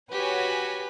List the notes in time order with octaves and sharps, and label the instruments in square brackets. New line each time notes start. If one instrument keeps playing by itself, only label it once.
[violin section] F#4 C#5 G#5 [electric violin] G4 B6 [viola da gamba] B4